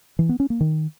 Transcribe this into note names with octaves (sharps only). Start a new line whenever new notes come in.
E3
B3
C#4
A#3
D#3